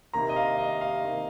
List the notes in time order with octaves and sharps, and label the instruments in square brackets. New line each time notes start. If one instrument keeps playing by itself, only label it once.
[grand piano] C3 D#3 A#3 A#5
D#5
F5
D#5
F5
C3 D#3 A#3